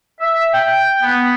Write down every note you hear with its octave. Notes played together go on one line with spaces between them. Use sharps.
E5
G5
B3